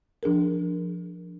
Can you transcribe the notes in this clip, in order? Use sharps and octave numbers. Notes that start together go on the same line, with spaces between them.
F3 D4 G#4 A#4